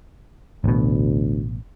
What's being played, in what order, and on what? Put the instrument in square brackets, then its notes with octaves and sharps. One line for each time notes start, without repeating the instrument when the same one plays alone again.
[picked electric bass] A1 B2 [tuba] D2